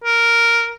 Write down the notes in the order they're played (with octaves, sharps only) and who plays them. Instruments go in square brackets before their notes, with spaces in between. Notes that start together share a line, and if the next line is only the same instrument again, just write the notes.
[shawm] A#4